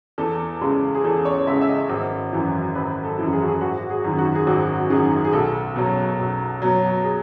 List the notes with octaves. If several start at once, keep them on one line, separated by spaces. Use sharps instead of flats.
E2 A4
C#3 G#3
G#4
E2 A4
C#5
C#3 G#3 E5
E5
D#5
G#1
F#2 E3
G#1 B4
A4
F#2 E3
G#4
F#4
G#4
G#1 F#4
G#4
F#2 D#3
F#4
G#4
G#1 F#4
F#2 D#3 G#4
G#4
B1 A4
B2 F#3
B1
B2 F#3
G#4